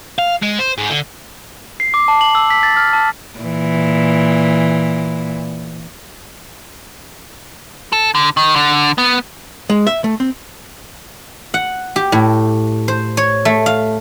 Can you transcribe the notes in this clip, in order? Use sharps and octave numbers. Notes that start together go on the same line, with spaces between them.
F5
G#3
C5
G#2
D3
C7
D6
A5
F#7
E6
B6
A6
F6
A5
A#2 E3
A4
D3
D#3
D3
B3
G#3
E5
A3
C4
F#5
G4
A2
C5
C#5
A3
F5